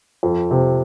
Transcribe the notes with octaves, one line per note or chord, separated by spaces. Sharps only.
F2
C3